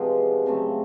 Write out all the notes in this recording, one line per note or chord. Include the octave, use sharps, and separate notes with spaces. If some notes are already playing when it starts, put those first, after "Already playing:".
Already playing: C3 F3 G#3 B3 G5
C#3 F#3 A3 C4